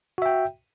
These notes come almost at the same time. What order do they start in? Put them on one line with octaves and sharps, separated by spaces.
F#4 E5 G5